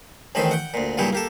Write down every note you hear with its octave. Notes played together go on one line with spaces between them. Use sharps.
A1 A2 D#3 E3 C4 B5
F#5 G5
D2 A#2
G2 A#2 C#3 F#3 E4 G4
A#3 G4 A4